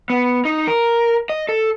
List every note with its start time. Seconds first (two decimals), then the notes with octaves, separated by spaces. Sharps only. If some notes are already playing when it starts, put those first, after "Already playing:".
0.10 B3
0.45 D#4
0.67 A#4
1.29 D#5
1.49 A4